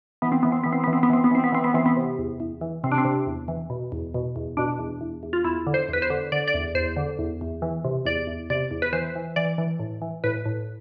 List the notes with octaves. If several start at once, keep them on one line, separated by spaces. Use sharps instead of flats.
E3 B3
C4
E3 B3
C4
E3 B3
C4
E3 B3
C4
B3
E3 C4
B3
E3 C4
B3
E3 C4
B3
E3 C4
B3
C3
E2
E2
E3
C3 C4
D4
C4
C3
E2
E3
B2
E2
B2
E2
B2 D4
E2
E2
E2
F4
E2 E4
D3
C5
E2 B4
C5
D3
D3 D5
D5
E2
E2 C5
D3
E2
E2
E3
C3
E2 D5
E2
C3 D5
E2
B4
E3 C5
E3
E3 D5
E3
A2
E3
A2 B4
A2